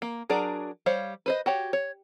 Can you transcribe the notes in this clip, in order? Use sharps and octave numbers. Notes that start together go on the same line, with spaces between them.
A#3
F#3 D4 G#4 A#4 D5
G3 C5 C#5 F5
B4 C5 D#5
F#4 G4 C#5
C#5